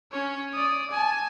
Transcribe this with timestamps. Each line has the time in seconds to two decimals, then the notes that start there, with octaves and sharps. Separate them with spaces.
0.12 C#4 C#5
0.53 D5 D#6
0.91 G#5 A5